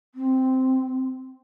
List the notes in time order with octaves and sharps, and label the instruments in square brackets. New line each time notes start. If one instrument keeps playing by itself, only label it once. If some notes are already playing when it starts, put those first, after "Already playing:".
[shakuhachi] C4